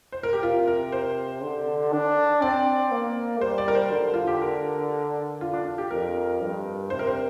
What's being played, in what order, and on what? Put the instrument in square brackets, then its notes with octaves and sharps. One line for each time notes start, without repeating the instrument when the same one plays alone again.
[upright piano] C5
A#4
G4
[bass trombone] C3 [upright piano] F4
[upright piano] A#4
C5
[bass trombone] D3
D4
[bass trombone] C4 [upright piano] D5
[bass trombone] A#3
[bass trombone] G3 [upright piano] C5
[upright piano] D5
A#4
C5
[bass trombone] D3
[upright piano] F4
G4
A#4
F4
D4
F4
G4
[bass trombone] F2 [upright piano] A#4
[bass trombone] G2
[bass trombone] C3 [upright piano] C5
[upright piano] A#4
C5